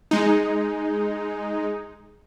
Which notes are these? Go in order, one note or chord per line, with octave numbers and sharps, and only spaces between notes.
G#3 D#4